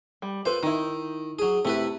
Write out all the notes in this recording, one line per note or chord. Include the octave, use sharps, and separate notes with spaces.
G3
F4 A4 B4 C5
D#3 D#4 E4
F#3 G#4
C3 A3 E4 B4